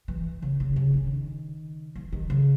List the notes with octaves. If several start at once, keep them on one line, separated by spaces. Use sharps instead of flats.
E3
C#3
C#3
C#3
D#3
E3
D#3
C#3